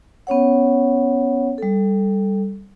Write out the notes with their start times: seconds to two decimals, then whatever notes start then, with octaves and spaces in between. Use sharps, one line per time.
0.27 B3 C#4 C#5 F#5
1.58 G3 A4